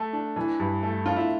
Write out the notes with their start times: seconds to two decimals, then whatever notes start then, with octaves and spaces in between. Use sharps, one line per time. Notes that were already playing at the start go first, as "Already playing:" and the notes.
Already playing: A3
0.13 D4
0.36 E3
0.59 G2
0.83 A3
1.05 D4 F4
1.16 E4